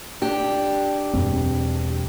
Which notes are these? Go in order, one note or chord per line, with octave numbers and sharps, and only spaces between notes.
D4 G4
E1 F#2 C4